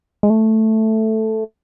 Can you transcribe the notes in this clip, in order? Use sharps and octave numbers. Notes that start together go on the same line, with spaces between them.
G#3
A3